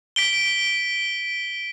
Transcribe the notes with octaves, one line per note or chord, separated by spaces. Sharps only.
B6 D7 G7